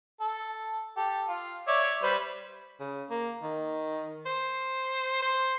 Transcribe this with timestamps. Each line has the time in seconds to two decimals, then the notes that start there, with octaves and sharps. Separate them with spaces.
0.20 A4
0.97 G4 A4
1.29 F4
1.67 C#5 D5 E5
2.03 G3 B4 C5
2.80 C#3
3.10 A#3
3.43 D#3
4.26 C5
5.22 C5